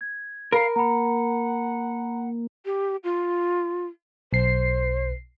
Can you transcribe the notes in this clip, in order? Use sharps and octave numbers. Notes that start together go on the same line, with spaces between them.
G#6
A#4 F5 B5
A#3 F#5 A#5 B5
G4
F4
B1 C5 C7